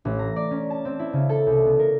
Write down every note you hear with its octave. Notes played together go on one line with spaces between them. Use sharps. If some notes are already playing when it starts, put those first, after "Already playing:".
A1
A#5
D5
C#4
A5
C4
E4
C#3
A4
C2
B3
A#4